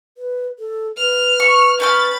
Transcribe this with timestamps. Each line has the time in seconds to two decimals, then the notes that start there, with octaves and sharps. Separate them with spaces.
0.18 B4
0.59 A4
0.97 B4 F6
1.40 C#6
1.80 C#4 G5 B5 F6 A6